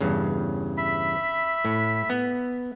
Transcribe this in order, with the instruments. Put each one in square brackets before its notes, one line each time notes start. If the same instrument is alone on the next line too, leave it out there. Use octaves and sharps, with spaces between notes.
[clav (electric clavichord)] E2 G2 C#3
[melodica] E5 B5
[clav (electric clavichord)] A2
B3